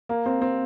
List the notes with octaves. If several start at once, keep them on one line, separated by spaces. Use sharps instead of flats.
A#3
C4
C4